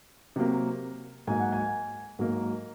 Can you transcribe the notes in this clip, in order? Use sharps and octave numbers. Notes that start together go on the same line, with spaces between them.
C3 F#3 A#3
G#2 F#3 A#3 G#5
F#5
G#5
G#2 F#3 A#3